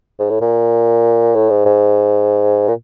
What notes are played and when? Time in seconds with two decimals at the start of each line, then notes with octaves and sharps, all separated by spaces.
0.19 G#2
0.30 A2
0.41 A#2
1.35 A2
1.50 G#2
1.66 G#2
2.68 A#2